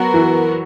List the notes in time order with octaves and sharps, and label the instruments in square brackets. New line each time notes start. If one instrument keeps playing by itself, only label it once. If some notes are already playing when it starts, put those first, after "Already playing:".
Already playing: [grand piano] F#3 [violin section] B3 F#4 A#4
[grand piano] E3